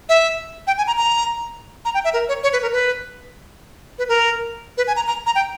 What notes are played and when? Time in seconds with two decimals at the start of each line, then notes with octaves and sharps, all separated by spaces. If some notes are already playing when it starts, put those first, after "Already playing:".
0.09 E5
0.67 G5
0.78 G#5
0.87 A#5
0.97 A#5
1.85 A#5
1.94 G5
2.05 E5
2.14 A#4
2.29 C#5
2.43 C#5
2.53 B4
2.62 A#4
2.73 B4
3.99 B4
4.08 A#4
4.78 B4
4.88 G#5
4.96 A#5
5.07 A#5
5.26 A#5
5.35 G5